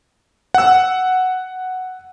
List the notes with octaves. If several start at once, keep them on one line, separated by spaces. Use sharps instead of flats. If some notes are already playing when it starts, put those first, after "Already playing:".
F#5 E6